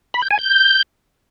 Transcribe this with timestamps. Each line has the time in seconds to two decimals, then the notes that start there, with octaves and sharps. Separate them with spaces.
0.14 B5
0.22 G6
0.30 G#5
0.39 G6